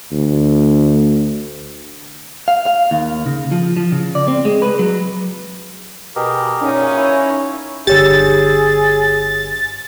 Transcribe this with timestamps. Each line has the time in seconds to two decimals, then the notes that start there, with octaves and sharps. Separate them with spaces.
0.12 D2
2.48 F5
2.66 F5
2.91 D#2
3.26 C#3
3.51 F3
3.77 F3
3.92 C#3
4.15 D5
4.28 C4
4.45 G#3
4.62 B4
4.79 F#3
6.16 B2 G4 G#4 A#4
6.62 F#2 A#2 C#4 D#4
6.97 E4 C#5
7.87 G1 D3 G4 G#4 C#5 E6 A6